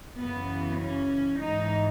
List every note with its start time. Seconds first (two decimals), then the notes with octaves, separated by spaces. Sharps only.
0.19 F#2 C#3 E3 B3
0.80 C#4
1.40 G#2 E3 D#4